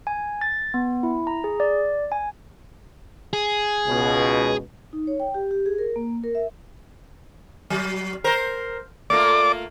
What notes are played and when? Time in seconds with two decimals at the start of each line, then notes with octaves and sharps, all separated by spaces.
0.07 G#5
0.41 A6
0.74 B3
1.03 E4
1.27 A#5
1.44 G#4
1.60 D5
2.12 G#5
3.33 G#4
3.87 C#2 B2
4.93 D#4
5.07 C#5
5.20 G5
5.34 G4
5.51 G4
5.66 G#4
5.78 A#4
5.96 A#3
6.24 A#4
6.35 E5
7.70 F#3
8.24 A#4 C5
9.10 A3 A#3 F4 D5 D6